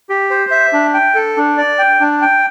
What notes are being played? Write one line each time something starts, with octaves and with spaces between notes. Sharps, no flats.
G4
C5
E5
D4
G5
A4
D4
D5
G5
D4
G5